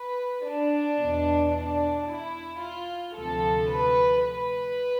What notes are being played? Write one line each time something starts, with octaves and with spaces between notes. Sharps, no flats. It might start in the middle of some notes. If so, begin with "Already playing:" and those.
Already playing: B4
D4
E2 B2
D4
E4
F4
D2 C3 F3 A4
B4
B4